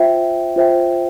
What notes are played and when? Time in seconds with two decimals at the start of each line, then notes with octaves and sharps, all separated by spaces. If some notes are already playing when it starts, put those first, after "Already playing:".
Already playing: F4 C5 E5 G5
0.56 F4 C5 E5 G5